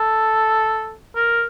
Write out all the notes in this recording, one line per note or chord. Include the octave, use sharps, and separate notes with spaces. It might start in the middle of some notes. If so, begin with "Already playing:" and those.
Already playing: A4
A#4